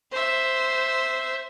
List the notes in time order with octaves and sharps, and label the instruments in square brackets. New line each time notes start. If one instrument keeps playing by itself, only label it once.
[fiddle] C5 E5